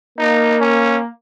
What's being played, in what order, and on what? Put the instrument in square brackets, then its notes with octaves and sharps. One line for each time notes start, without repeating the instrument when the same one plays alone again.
[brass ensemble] A#3 [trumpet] D#4
[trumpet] C#4